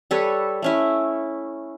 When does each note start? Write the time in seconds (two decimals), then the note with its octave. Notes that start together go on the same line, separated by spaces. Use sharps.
0.11 G3 A4 B4 C#5
0.62 A3 C#4 E4